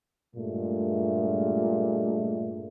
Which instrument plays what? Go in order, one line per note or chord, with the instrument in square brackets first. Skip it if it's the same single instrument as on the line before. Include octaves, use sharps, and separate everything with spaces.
[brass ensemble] G2 G#3 A3 [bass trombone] A#2